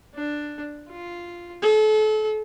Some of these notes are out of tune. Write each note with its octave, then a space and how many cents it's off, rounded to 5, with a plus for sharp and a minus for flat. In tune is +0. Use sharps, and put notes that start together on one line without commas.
D4 +5
F4 -5
A4 -35